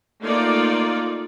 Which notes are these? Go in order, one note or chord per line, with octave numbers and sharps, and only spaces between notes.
A3 A#3 D#4 F4 D5